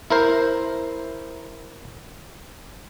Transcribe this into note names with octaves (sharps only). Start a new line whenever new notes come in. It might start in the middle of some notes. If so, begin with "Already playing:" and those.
E4 A#4 C5